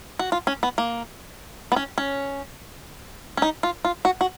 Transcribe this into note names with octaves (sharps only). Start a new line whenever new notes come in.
F#4
F4
C#4
B3
A#3
B3
C#4
C#4
C#4
D#4
F4
F4
F#4
F#4